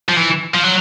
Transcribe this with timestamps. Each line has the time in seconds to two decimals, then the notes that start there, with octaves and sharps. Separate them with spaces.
0.09 F3
0.17 E3
0.54 F3
0.64 F#3